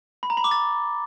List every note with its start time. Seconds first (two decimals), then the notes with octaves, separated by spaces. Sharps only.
0.23 B5
0.30 A#5
0.37 B5
0.44 D6
0.51 A6